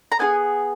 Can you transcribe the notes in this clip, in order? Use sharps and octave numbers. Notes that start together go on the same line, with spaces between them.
A#5
B3 F4 G#4 G#5